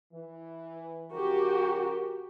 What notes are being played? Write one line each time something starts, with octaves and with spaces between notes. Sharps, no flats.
E3
C#3 F3 F#4 G4 A#4